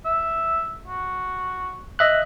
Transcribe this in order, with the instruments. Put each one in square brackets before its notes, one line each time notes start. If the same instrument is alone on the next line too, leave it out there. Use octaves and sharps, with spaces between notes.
[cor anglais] E5
F#4
[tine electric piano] D#5 E5 F#6